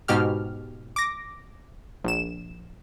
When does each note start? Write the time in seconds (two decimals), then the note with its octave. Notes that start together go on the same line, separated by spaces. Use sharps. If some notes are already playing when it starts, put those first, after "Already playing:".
0.08 G#2 B2 G4 F6
0.96 D6 A#6
2.04 A#1 E7